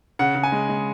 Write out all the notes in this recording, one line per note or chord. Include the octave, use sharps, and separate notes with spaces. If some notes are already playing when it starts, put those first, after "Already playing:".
C#3 F#5
C#3
G#5
G#3
G#3